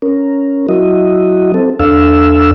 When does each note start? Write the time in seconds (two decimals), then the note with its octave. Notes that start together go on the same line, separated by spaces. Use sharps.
0.02 C#4 A#4
0.69 F#3 E4 F#4 D#5
1.54 C4 A4
1.80 E2 D4 A4 F5 E6